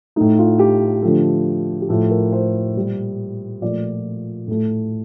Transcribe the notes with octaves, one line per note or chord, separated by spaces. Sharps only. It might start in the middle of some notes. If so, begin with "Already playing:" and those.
A2 A3 D#4
F4
G4
D3 F3 A3
G4
A2 F3 A3 A4
A#4
C5
A#2 G3
A#2 F3 A3 D5
A2 A3